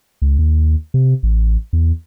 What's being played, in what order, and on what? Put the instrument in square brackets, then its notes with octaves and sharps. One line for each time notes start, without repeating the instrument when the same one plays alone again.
[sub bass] C#2
D#2
C3
A1
E2